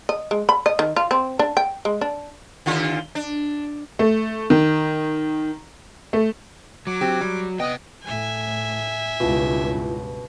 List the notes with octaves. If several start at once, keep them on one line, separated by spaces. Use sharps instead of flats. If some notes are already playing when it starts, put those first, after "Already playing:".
D#5
G#3
B5
D#5
D#3
F4
C4
D4
G5
G#3
D4
D#2 D3 F4
D4
A3
D#3
A3
F#3 D6
C4 G4
G3
C3 B3 D#5 G5
A2 E5 G#5
C#2 G2 B2 E4 F4